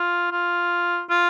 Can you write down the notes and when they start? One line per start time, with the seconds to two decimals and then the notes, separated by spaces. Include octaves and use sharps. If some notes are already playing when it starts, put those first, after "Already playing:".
Already playing: F4
0.32 F4
1.10 F4